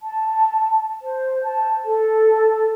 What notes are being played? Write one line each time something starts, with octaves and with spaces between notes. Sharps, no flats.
A5
C5
A5
A4